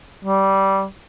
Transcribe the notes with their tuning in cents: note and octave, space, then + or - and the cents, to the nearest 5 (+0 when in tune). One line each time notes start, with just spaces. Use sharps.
G3 -15